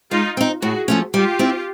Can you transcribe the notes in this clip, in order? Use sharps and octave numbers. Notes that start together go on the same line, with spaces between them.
G#3 D#4 F4
C4 D#4
A2 F#4 G#4
F3 A3 C#4
G3 F4 G4
C4 E4